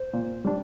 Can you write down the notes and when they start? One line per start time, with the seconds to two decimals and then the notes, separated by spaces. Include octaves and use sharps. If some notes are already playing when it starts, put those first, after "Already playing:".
Already playing: C5
0.13 A#2
0.45 G3 D4